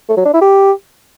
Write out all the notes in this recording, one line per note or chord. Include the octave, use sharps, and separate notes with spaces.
A3
F#3
D4
E4
G4